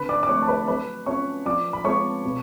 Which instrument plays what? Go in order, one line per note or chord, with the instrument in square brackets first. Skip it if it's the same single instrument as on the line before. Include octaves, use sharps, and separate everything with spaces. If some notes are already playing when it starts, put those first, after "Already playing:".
Already playing: [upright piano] D3 B4 B5
D5 D6
D6
F3 A3 C#5 C#6
A5
B4 B5
F#3 B4 B5
C#4 F4 C#5 C#6
F3 D5 D6
B5
G#3 B3 F4 C#5 C#6
B2